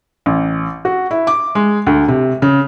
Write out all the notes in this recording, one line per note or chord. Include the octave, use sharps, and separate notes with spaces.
A1
F#4
E4
D6
G#3
D2
C3
C#3